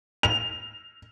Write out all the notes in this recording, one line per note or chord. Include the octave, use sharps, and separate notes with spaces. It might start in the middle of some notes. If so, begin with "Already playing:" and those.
F7